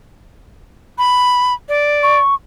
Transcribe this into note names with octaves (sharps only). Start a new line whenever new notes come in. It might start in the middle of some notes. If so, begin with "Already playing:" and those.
B5
D5
C#6